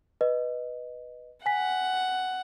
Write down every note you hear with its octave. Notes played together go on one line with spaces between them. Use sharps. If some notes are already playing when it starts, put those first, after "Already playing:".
B4 D#5
F#5 G#5 B6